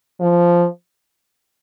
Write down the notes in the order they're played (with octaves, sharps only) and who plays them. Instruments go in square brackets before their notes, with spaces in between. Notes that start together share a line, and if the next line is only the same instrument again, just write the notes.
[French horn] F3